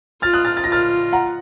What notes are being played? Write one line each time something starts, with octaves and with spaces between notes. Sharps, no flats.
F4 F6 A6
D#6 F#6
F6 A6
A6
A#6
F4 F6 A6
F#5 A#5